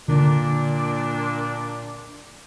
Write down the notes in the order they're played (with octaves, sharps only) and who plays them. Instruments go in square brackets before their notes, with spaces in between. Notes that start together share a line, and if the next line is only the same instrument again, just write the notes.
[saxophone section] A#2 D4 [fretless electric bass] D3